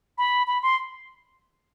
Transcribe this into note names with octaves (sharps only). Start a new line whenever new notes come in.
B5
B5
C6